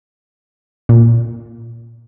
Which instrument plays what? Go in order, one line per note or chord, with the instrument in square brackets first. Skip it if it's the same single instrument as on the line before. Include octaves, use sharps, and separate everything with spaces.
[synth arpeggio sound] A#2